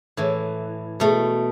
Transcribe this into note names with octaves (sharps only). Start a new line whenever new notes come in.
A2 E3
B2 A3